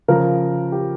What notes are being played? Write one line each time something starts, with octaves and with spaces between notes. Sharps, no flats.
C#3 F3 A#4
G4